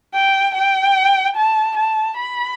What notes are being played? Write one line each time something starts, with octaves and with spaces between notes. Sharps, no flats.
G5
G5
A5
A5
B5